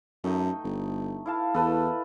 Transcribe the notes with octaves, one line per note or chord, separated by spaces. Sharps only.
F#2 A3 D#4 G5
G1
E4 F5 A5
E2 A4 B4